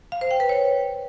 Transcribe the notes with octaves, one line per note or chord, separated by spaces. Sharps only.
F5
C5
G5
B4
C#5